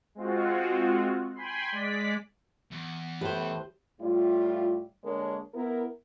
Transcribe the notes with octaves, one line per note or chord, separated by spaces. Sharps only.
G#3 C4 F4 F#4
G5 G#5 B5 C6
G#3 D5 B6
E2
A2 G4 B4 C5
A2 G3 E4 F4
D3 G#3 A#3 D4 A#4 C#5
B3 E4 A#4